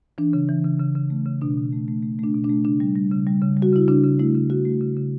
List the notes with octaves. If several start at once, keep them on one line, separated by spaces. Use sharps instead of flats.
E3 D4
C#3
E3
C#3
C#3
C#3
A3
C#3
B2 D4
B2
A3
A3
A3
A3 D4
B2
D4
A3
C#3 D4
G3
G3
C#3
G3
C#3
G3
F#4
C#3 E4
C#3 D4
C#3
A3 E4
C#3
C#3 F#4
A3
C#3
C#3